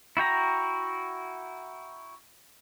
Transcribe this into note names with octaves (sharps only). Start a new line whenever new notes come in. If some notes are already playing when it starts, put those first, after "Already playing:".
E4 F#4 G5 A#5